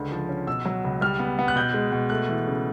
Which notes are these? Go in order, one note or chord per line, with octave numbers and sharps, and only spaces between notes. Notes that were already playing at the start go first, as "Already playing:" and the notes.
Already playing: C#2 D3
F3
C#4
B2 E6
F#3
C#2
G3 F6
B3
B3
F#6
B2 G6
G#3
B2
A3 F#6
E3
C#3